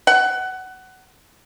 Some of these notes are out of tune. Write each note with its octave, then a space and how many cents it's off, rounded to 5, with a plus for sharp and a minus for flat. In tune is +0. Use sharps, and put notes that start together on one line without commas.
F#5 +20